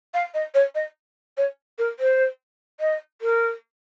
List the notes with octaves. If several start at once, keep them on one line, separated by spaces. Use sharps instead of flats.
F5
D#5
C#5
D#5
C#5
A#4
C5
D#5
A#4